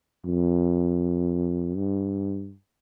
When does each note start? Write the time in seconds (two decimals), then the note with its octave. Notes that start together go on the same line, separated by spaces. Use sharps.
0.25 F2
1.77 G2